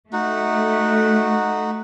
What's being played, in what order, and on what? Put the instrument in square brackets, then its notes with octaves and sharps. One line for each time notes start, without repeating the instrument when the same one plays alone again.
[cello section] A3 [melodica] D#4 F#4